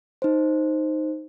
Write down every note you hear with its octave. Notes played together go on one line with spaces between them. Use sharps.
D#4 C5